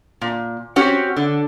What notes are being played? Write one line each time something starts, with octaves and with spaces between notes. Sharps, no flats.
A#2
C4 C#4 F#4 G4 C#5
D3